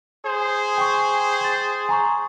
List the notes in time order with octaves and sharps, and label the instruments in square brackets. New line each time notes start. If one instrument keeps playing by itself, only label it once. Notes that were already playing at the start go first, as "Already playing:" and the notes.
[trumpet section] G#4 C5
[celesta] G5 G#5 C#6
G#6 A6
G#5 A#5 C#6